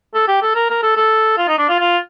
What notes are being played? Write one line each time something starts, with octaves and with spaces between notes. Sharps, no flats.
A4
G4
A4
A#4
A#4
A4
A4
F4
D#4
D4
F4
F4